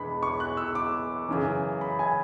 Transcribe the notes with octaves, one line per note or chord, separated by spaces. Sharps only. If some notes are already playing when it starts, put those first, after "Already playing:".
Already playing: E2 B2 G#3 B3 D4 B5
C#6
F#6
E6
D6
F#2 C#3 E3
B5
G#5